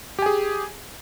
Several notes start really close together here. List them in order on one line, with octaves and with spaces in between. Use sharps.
G4 G#5 G#4